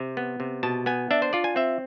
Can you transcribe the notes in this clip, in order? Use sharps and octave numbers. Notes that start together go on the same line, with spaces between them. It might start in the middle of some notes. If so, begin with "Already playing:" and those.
Already playing: C3
B3
C3
B2 A5
B3 G#5
D4 E5
C5
F4 D5
G#5
C4 E5